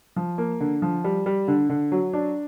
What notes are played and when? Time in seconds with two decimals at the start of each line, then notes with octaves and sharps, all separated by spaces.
0.16 F3
0.38 A#3
0.60 D3
0.82 F3
1.04 G3
1.26 G3
1.48 D3
1.69 D3
1.92 F#3
2.13 D4